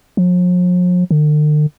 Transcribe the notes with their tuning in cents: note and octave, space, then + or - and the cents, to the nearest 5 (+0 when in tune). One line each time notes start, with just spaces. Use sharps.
F3 +45
D3 +45